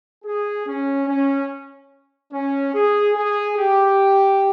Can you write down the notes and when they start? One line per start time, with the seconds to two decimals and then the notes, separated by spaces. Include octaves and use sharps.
0.24 G#4
0.66 C#4
1.07 C#4
2.32 C#4
2.74 G#4
3.15 G#4
3.57 G4